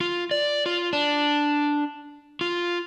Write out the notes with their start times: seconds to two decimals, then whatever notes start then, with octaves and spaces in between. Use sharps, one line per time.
0.01 F4
0.31 D5
0.66 F4
0.93 D4
2.41 F4